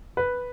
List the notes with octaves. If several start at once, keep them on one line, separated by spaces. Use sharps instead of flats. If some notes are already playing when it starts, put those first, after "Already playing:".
B4